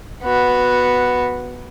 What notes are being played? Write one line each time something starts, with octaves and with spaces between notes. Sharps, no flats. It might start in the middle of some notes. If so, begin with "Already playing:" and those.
B3 F#4